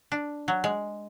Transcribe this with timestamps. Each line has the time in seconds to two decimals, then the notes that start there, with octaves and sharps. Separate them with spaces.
0.12 D4
0.48 F#3
0.64 G#3